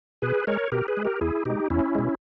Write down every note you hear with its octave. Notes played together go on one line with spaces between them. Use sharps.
B2 G#4 B4
G#3 A#4 C#5
B2 G4 A#4
G#4 B4
G#3
G4 A#4
E2 E4 G#4
B2 G#3 D#4 G4
E2 C#4 E4
B2 G#3